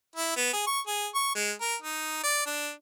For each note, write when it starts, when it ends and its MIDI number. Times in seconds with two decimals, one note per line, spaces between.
0.16 0.36 64
0.37 0.53 59
0.53 0.66 68
0.67 0.80 85
0.87 1.07 68
1.15 1.30 85
1.35 1.52 56
1.61 1.76 70
1.82 2.20 63
2.24 2.42 74
2.46 2.71 62